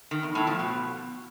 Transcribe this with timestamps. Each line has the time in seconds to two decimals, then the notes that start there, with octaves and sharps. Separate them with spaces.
0.11 D#3
0.23 E2
0.35 A2
0.47 F3
0.59 B2